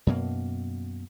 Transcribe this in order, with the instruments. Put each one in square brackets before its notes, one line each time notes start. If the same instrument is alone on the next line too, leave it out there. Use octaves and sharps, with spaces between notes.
[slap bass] F#2 B2 A#3